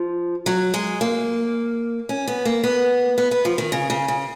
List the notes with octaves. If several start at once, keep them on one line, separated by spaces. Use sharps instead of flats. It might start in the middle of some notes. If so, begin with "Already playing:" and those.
Already playing: F3
F#3
G#3
A#3
C#4
B3
A#3
B3
B3
B3
F3
D#3
C#3
C#3
C#3